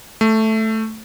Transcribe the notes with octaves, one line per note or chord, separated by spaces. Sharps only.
A3